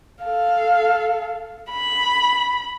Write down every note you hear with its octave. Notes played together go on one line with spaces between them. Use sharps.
A4 F5
B5